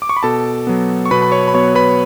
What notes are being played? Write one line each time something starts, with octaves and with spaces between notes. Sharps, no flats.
D6
C#6
B5
B2 A4 A5
F#3 B3
C#6
B2 B4 B5
B5
C#5 C#6
B5
F#3 B3 C#5 C#6
B4 B5